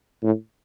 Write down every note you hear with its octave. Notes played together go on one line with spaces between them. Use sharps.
A2